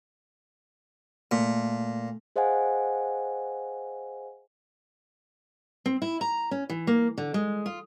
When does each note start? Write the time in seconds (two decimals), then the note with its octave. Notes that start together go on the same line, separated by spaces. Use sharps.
1.31 A#2 A3
2.36 G#4 C5 D#5 F5 F#5 G#5
5.86 C4
6.02 E4
6.21 A#5
6.51 C#4
6.70 E3
6.87 A#3
7.18 D3
7.34 G#3
7.66 F4